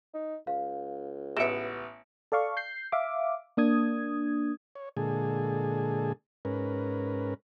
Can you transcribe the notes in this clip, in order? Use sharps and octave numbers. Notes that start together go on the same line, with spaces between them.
D#4
C#2 F5
A1 B3 D#5 E5 C#7 D7 E7
A4 D5 F5 C#6
G6 C7
E5 F5 D6
A#3 D4 D#6 G#6
C#5
A#2 D3 G#3 G#4 A4
G#2 C#4 A#4 B4